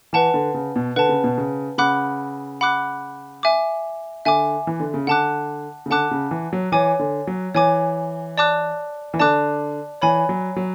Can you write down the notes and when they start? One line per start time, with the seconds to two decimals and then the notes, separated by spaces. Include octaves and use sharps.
0.13 E3 B4 F#5 A5
0.34 D3
0.54 C#3
0.76 B2
0.96 D3 B4 F#5 A5
1.09 C#3
1.24 B2
1.38 C#3
1.78 C#3 F#5 B5 D6 F#6
2.61 F#5 B5 D6 F#6
3.43 E5 G#5 D6
4.25 D3 E5 G#5 D6
4.67 E3
4.80 D3
4.94 C#3
5.07 D3 F#5 A5 D6 F#6
5.86 C#3
5.90 D3 F#5 A5 D6 F#6
6.11 C#3
6.31 E3
6.53 F#3
6.72 E3 C#5 G#5 D6
6.99 D3
7.27 F#3
7.55 E3 C#5 G#5 D6
8.38 D5 A5 D6 F#6
9.14 E3
9.19 D3 D5 A5 D6 F#6
10.02 E3 C#5 G#5 B5
10.29 F#3
10.56 F#3